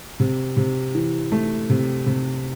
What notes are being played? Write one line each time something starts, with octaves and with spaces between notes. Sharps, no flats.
C3
C3
E3
A3
C3
C3